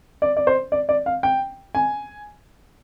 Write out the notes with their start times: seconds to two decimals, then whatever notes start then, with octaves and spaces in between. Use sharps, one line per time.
0.22 D5
0.37 D5
0.47 C5
0.72 D5
0.89 D5
1.06 F5
1.23 G5
1.75 G#5